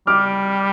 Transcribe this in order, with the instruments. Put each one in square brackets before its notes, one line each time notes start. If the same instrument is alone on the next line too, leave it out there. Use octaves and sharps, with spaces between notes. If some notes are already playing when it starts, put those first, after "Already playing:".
[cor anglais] G3 [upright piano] D6 F6